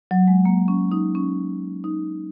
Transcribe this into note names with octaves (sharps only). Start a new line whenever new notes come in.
F#3
G#3
A#3
C#4
D#4
C#4
D#4